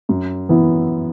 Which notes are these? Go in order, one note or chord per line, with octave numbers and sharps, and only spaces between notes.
F#2
E3 B3 E4